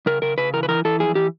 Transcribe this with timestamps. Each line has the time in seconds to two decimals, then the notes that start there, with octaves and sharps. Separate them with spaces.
0.06 C#3 A#4
0.22 C#3 A#4
0.38 C#3 B4
0.54 E3 A#4
0.63 B4
0.68 E3 A#4
0.85 E3 A4
1.00 F2 G#4
1.15 E3 G4